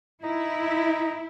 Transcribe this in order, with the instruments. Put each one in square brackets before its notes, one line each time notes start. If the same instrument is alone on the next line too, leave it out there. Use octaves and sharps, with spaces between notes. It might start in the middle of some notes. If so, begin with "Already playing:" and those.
[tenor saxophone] D#4 [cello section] E4